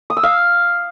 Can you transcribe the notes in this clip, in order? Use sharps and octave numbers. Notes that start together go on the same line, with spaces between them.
D#6
E6
F5